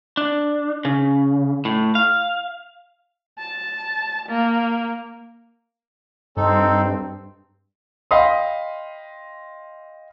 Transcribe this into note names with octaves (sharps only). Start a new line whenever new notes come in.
D4
C#3
A2
F5
A5
A#3
G2 C4 D#4 A4
D#5 F5 G5 B5 C6 D#6